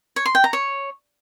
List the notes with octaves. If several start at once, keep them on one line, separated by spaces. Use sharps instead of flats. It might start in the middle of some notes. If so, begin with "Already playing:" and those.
C#5
C6
G5
A#5
C#5